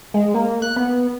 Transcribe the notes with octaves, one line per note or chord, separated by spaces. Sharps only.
G#3
A#3
F#6
B3